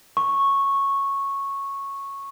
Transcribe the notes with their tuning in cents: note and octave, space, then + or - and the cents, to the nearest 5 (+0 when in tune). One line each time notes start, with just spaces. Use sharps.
C#6 -10